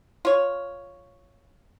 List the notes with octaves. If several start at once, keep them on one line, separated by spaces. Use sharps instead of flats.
F4 C#5